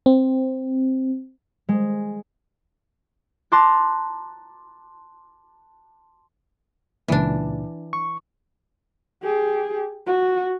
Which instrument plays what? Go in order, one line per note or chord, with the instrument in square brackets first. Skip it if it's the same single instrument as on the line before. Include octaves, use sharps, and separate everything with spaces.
[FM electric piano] C4
[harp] G#3
A5 A#5 C6 D6 F#6
[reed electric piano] C#2 A#2 [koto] E3 D4
[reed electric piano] C#6
[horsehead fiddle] G4 G#4
F#4